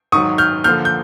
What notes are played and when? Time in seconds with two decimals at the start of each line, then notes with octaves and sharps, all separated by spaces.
0.12 G#2 D#3 F#3 C#6 D#6
0.38 F6 G6
0.64 D3 F3 A#3 F6 G6
0.85 G6